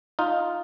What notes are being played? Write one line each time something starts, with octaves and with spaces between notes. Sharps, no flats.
D#4 F4